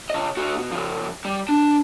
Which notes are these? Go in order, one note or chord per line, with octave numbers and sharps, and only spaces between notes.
C#3 D#5
D2 F#4
B2
C#3 F3
G3
D4